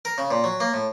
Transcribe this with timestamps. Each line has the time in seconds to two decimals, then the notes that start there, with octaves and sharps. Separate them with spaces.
0.05 A#4
0.18 C#3
0.31 A#2
0.44 F#3
0.60 A#3
0.73 A2